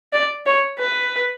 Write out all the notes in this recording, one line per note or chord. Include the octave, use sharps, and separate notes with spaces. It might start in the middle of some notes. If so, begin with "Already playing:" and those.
D5
C#5
B4